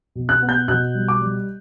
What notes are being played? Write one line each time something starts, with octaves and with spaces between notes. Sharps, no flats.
B2
F#6
B3
G6
B2 F#6
G3
D6
G3